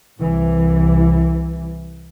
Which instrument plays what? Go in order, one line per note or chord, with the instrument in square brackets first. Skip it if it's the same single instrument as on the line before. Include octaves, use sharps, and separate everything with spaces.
[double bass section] C2 E3